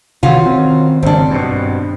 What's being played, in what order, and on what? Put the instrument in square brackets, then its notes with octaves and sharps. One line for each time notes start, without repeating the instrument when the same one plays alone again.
[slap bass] C3 D#3 E3 [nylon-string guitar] C#4 F4 F#4
[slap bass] D#3 C4
[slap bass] G#1 C#3 [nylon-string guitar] C4 D4
[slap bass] G2 B2